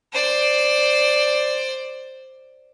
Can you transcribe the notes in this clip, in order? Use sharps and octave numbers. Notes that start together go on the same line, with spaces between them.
C5 D5